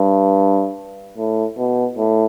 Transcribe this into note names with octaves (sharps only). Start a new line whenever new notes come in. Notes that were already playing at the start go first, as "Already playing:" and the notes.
Already playing: G2
A2
B2
A2